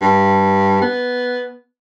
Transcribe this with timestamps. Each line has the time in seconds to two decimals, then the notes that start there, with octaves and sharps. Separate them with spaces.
0.02 G2
0.82 B3